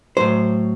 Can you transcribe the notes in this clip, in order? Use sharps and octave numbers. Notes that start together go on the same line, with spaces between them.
A2 F#3 C5